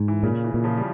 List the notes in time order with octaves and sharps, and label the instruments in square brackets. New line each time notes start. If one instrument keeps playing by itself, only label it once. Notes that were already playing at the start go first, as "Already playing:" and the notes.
Already playing: [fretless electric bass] G#2
[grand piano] E3
[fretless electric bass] A#2 [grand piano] C#3
[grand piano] E3
[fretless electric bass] A#2
[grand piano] C#3 F3
G3